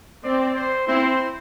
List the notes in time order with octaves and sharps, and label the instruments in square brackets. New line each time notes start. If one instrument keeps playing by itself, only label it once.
[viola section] C4 [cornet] D5
[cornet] C5
[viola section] C4 E4 [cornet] C5